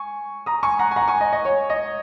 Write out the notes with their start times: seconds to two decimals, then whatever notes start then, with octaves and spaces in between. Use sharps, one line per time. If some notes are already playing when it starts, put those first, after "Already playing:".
Already playing: G#5 C#6
0.46 A#5 D#6
0.63 G#5 C#6
0.79 F#5 A#5
0.91 G#5
0.96 F#5 A#5
1.08 G#5 C#6
1.21 D#5
1.33 D#5
1.45 C#5
1.70 D#5